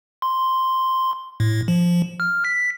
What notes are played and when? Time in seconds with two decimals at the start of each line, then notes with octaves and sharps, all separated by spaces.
0.22 C6
1.40 A2
1.68 F3
2.20 F6
2.45 B6